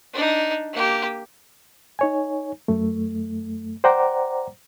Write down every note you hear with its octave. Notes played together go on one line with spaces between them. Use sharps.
D4 D#4
A#3 G4
D#4 C#5 G#5
F#2 A3
C5 D5 F#5 G5 A#5 D6